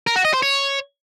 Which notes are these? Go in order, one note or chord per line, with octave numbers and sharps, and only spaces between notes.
A#4
F#4
D#5
C5
C#5